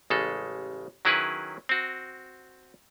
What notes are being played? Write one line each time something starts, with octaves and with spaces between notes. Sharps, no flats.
A1 C#3 G#3 A4
D#3 F#3 C#4 E4 G#4 B4
C4 F#4